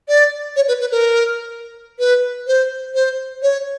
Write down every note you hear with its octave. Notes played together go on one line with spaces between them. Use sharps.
D5
C#5
B4
B4
A#4
B4
C5
C5
C#5